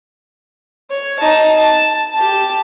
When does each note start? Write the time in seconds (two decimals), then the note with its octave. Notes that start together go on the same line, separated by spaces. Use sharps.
0.90 C#5
1.19 D#4 A5
1.57 A5
2.13 G4 A5